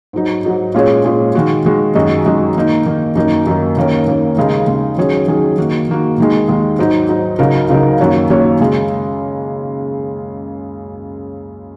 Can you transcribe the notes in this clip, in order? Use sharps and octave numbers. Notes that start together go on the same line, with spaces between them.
G#2 F#3 D#4
G#2 F#3 D#4
A#2 G#3 C#4 G#4 C#5
A#2 G#3 C#4 G#4 C#5
D#3 G#3 F#4
D#3 G#3 F#4
F#2 D#3 G#3 F#4 D#5
F#2 D#3 G#3 F#4 D#5
D#3 A#3 D#4
D#3 A#3 D#4
F#2 D#3 A#3 D#4 A#4
F#2 D#3 A#3 D#4 A#4
D#2 D#3 A#3 C#4 A#4
D#2 D#3 A#3 C#4 A#4
D#2 C#3 G#3 D#4
D#2 C#3 G#3 D#4
D#3 F#3 C#4 G#4
D#3 F#3 C#4 G#4
D#3 A#3 F#4
D#3 A#3 F#4
D#2 D#3 G#3
D#2 D#3 G#3
G#2 F#3 D#4
G#2 F#3 D#4
C#2 C#3 F#3 D#4 A#4
C#2 C#3 F#3 D#4 A#4
F#2 D#3 A#3 F#4 C#5
F#2 D#3 A#3 F#4 C#5
C#3 G#3